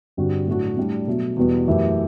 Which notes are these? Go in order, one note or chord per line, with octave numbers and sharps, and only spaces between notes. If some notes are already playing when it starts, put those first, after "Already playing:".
G2 D3 G3 C4 F#4
A2 F#3 A3 D4 F#4
A2 G3 D4
B2 F#3 A3
E2 B2 G3 B3 F#4
F#2 E3 A3 E4 G4